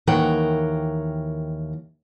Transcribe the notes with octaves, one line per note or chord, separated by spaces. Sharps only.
D#2 E3 A#4 C#5 F#5 G5